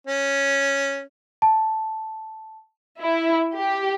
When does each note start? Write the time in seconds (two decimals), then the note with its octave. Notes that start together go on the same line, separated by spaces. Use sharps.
0.07 C#4
1.42 A5
3.00 E4
3.55 G4